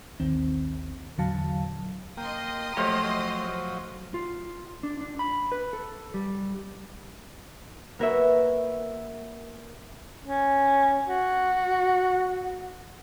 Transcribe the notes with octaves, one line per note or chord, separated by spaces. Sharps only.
A1 D#2 D#3 C4
E2 A#2 D3 F#3 F5 A5
A#3 D#5 G5 C6 D#6
F3 F#3 A3 G4 C5 C#5 F5 D6
F4
D4
D4
B5
B4
A4
G3
A#3 F#4 A#4 B4 C#5 E5
C#4
F#4